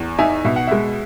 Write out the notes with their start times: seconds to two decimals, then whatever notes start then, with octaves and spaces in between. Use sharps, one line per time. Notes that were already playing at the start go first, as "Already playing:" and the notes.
Already playing: E2
0.19 D#4 E5 G#5
0.45 B2 E5
0.56 F#5
0.67 G#3 E5